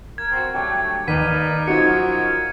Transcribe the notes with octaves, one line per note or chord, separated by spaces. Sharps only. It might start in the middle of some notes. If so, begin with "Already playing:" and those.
A#4 G#6
C4 F#4
F#3 G3 A3 D4 G5
D#2 D#4 A#4 B4 D5 B6 D#7
F#2 F3 F#3 D#4 F#4 G#6 C#7